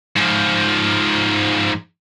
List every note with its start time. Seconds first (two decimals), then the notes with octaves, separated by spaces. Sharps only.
0.16 G#2 F3